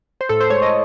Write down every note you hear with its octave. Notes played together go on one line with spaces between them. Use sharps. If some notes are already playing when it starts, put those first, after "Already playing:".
C5
A2 A4
C5
G#3 C#5
D#5